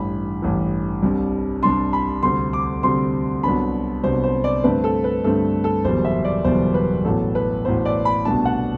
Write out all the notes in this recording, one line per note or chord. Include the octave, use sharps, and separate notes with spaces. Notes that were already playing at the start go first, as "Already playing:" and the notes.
Already playing: A1 G2 E3 B5
A1 G2 E3
C2 C3 G3 D4
C2 C3 G3 D4 C6
B5
D2 C3 G3 C4 C6
D6
D2 C3 G3 C4 C6
C2 C3 F#3 B3 D4 B5
C2 C3 F#3 B3 D4 C5
C5
D5
G2 D3 A3 C4 B4
A4
B4
G2 D3 A3 C4 A4
A4
F#1 E2 B2 G3 C5
E5
D5
F#1 E2 B2 G3 C5
B4
A1 A2 F#3 B3 A4
B4
A1 A2 F#3 B3 C5
D5
B5
C2 B2 A3 D4 A5
F#5